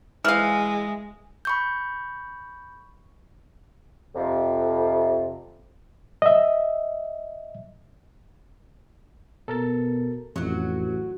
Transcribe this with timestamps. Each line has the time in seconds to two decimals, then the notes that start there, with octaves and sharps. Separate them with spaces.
0.25 E3 G#3 F5 F6
1.45 B5 C#6 G6
4.15 F2 C3
6.22 D#5 E5
9.48 B2 A4 A#4 A6
10.36 A1 F2 F#3 F#4